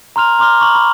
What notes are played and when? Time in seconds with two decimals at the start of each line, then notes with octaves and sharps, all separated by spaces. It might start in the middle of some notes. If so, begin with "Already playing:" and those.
0.16 A#5 C6 F6 F7
0.39 A#5 C6 D6 F6 G7
0.60 A#5 C#6 D6 F#7
0.75 B5